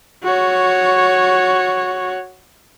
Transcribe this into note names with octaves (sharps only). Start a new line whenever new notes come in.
F#4 C#5